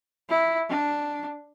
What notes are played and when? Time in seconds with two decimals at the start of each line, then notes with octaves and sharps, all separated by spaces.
0.29 E4
0.69 D4